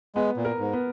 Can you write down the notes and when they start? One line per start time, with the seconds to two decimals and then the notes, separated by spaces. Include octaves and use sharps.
0.15 G#3 B3
0.37 A#2
0.45 A#4
0.59 G#2
0.73 B3